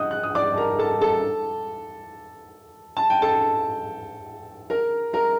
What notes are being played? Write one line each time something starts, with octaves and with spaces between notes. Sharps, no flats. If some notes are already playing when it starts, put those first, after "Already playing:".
Already playing: D#5 F#5 D#6 F#6 G6
F#6
D#6
D5 D6
A5
A#4 A#5
A4 A5
A4 A5
A5
G5
A4 A5
A#4 A#5
A#4 A#5